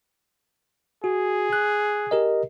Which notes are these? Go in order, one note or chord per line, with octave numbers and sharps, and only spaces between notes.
F#4 G#4
F#6
G4 A#4 D#5